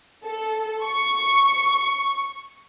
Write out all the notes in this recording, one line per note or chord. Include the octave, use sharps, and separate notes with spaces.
A4
C#6